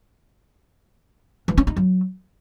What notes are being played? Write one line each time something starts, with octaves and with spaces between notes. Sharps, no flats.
E3
C#4
D#4
F#3